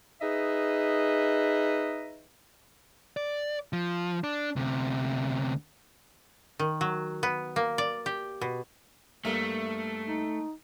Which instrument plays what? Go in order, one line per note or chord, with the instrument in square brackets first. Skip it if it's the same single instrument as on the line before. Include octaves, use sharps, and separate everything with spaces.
[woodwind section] D#4 G#4 B4 D#5 E5
[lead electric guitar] D5
F3
D4
D2 C3
[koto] D#3
F#3
B3
A#3
D5
G4
B2
[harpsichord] G2 A#3 E5 [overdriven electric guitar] A3
[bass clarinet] D#4